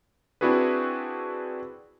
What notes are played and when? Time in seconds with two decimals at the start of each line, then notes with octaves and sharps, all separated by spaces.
0.41 C4 D4 E4 F#4 G#4 B4